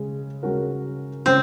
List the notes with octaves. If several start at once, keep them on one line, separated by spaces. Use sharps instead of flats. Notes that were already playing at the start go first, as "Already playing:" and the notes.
Already playing: C#3 G#3 C#4
C#3 G#3 C#4 F#4 A#4
C#3 G#3 C4 C#4